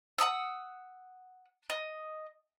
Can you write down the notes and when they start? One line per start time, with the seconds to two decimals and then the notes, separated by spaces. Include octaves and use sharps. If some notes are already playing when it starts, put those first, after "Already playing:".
0.18 F#5 A#5 D#6 E6
1.70 D#5